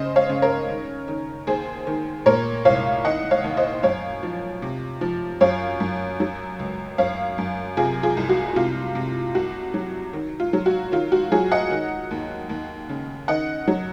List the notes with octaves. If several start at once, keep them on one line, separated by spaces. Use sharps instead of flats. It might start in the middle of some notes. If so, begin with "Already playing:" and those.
Already playing: C#3 C5 D#5
C#5 F5
C#3
A#4 C#5
D#3
D#3
D#2 G#4 C5
D#3
A#2 A#4 C#5
C2 C#5 F5
D#3 D#5 F#5
C#5 F5
D#2
C5 D#5
F#2 C#5 F5
F3
C3
F3
F#2 C#5 F5
F#2
F#3
C#2
F#2 C#5 F5
F#2
C3 F4 G#4
F4 G#4
C2
F#4
C3 F4
C3
C2 F#4
F#3
D#3
F4
F#3
F#4
D#3 F4
F#4
F#3 F4 G#4
D#5 F#5
D#3
D#2
D#2
C#3
D#3 D#5 F#5
F#3